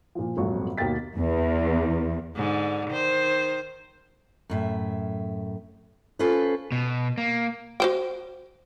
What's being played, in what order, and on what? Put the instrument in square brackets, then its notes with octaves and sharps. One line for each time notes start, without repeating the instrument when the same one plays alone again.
[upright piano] A#2 F3
D#1 G#1 F2 F#3 C#6
D#2 B2 A#3 G5 A6 B6
[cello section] E2
[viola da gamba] G#2 D3
D#3 C5
[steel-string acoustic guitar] F#2 A2 E5
C#4 F4 A4 B4 C5
[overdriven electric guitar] B2
A#3
[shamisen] F#4 C5 G5